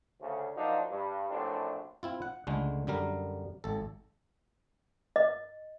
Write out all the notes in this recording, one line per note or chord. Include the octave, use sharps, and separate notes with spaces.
D2 C#3
F3 F#3 A#3 D4 D#4
G2
A#1 F#2 A2 C4 D4
C4 E4 F4
F#5
C#2 D3 G#3 A3
F#2 D3 G3 A#4
G#1 A4
D#5